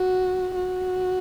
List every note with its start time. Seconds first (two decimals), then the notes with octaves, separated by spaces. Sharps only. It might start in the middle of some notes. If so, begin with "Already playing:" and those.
Already playing: F#4
0.56 F#4